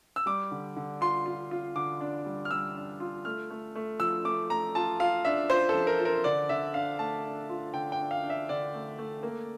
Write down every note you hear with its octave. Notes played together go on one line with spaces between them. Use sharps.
E6
G3 D6
D3
D3
F4 C6
F4
F4
D3 D6
D4
G3
F6
G3 E6
D4
F4
A3 F6
A3
A3
F3 E6
A3 D6
A3 A#5
F4 A5
F4 F5
D4 E5
F4 C5
A4
F3
A#4
F4
A#4
D3 D5
D3 E5
D4 F5
A3 A5
D4
F4
D3 G5
G5
D4
F5
D4
E5
D3 D5
A3
A3
A#3